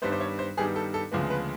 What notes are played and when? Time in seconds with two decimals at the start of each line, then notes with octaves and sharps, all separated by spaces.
0.02 G2 D#3 G3 B3 C5
0.12 C5
0.20 C#5
0.39 C5
0.57 G2 D#3 G3 B3 G#4
0.76 A4
0.94 A4
1.12 D2 C#3 F3 G#3 B3
1.30 B4